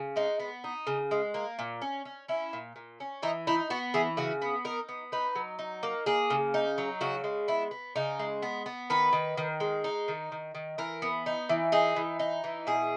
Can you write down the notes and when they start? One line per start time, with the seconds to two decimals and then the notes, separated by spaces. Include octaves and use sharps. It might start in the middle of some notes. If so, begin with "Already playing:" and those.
Already playing: C#3
0.16 G#3 D#4
0.40 B3
0.64 D#4
0.87 C#3
1.11 G#3
1.34 A#3
1.59 A#2
1.82 C#4
2.05 C#4
2.28 C#4 E4
2.53 A#2
2.76 A#2
3.00 C#4
3.22 E3 D#4
3.47 D#4 E4
3.70 B3 F#4
3.94 E3 G#4
4.17 C#3 F#4
4.42 B3
4.64 D#4 A#4
4.89 B3
5.12 D#4 B4
5.35 F#3
5.59 D#4
5.83 A#3
6.06 A#3 G#4
6.30 C#3
6.54 D#4
6.78 F#3
7.01 C#3 F#4
7.24 G#3
7.48 B3 E4
7.71 B3
7.96 C#3 D#4
8.19 G#3
8.42 B3
8.66 B3
8.90 D#3 B4
9.13 D#3
9.37 D#3
9.60 G#3
9.84 D#4
10.08 D#3
10.32 D#3
10.55 D#3
10.78 E3 A#4
11.02 B3
11.26 D#4
11.49 E3
11.72 D#4 G#4
11.96 E3
12.19 D#4
12.44 E3
12.67 B2 G#4